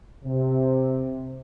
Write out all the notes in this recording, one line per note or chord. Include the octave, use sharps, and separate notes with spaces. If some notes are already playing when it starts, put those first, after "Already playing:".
C3